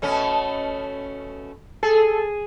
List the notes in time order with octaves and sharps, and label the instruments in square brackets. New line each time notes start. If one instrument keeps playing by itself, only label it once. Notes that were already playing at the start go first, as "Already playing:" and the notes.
[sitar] B2 A3 C#4
[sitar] G#4 [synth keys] A4